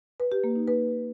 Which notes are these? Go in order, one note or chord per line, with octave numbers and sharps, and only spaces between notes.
B4
G4
A#3
D#4
B4